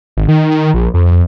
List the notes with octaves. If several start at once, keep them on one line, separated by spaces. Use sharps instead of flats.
G#1
D#3
D#3
A#1
F2
F2